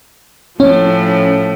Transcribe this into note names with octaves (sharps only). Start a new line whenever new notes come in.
A2 F3 C#4